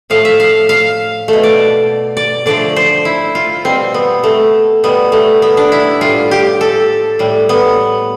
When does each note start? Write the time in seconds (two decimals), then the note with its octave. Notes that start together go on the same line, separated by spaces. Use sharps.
0.10 A2 F3 A3 F5
0.25 E5
0.40 F5
0.69 F5
1.28 B2 A3
1.43 D5
2.17 D5
2.46 D3 F3 A3 D5
2.76 C5
3.05 E4
3.35 F4
3.64 B2 G3 C4
3.94 B3
4.23 A3
4.83 B2 G3 B3
5.12 A3
5.42 B3
5.57 D4
5.72 E4
6.01 A2 G3 F4
6.31 G4
6.61 A4
7.19 A2 G3
7.49 B3